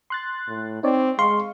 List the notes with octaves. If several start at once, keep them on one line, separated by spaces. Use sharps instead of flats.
C6 F#6 A6
A2
C4 D#4 C#5 D5
G#3 F5 C6 C#6